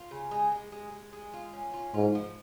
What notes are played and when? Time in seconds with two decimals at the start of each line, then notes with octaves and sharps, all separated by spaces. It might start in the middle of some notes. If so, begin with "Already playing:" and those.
Already playing: F4
0.11 C#3
0.31 G#3
0.52 G#3
0.72 G#3
0.92 G#3
1.13 G#3
1.33 F4
1.53 C#4
1.74 F4
1.94 G#2 F4
2.15 F3